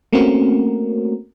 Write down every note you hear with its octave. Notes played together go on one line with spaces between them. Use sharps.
A3 A#3 C4 C#4 F#4 A#4